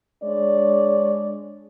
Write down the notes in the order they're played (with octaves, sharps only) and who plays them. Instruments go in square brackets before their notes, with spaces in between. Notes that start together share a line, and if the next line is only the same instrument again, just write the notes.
[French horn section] G#3 D4 C#5 D5